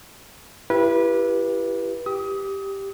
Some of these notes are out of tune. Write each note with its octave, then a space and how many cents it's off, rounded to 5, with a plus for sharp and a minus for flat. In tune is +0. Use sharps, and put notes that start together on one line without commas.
E4 +35 G4 +0 B4 -25
G4 +0 D#6 +25